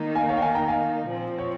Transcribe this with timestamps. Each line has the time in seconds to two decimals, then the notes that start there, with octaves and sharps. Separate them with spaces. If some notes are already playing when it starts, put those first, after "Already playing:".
Already playing: D#3 A#3 D#4
0.15 F5 G#5
0.29 C#5 F5
0.37 G5
0.42 F5 G#5
0.55 G5 A#5
0.68 F5 G#5
1.07 A#2 F3 C4
1.39 C#5